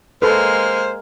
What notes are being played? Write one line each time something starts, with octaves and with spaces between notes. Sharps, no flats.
G#3 A#3 A4 B4 C5 F6